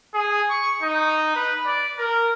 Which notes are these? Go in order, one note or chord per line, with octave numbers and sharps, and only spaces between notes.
G#4
C#6
D#4
B4
D5
A#4